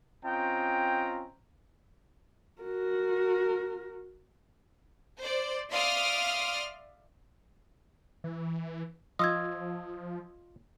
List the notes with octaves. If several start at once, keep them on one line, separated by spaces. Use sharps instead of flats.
C4 C#4 F4 D#5 G5 A#5
F#4 A#4
C5 D5
D5 E5 F5 C6 D#6 F6
E3
F3 F4 D#5 D#6 E6 G#6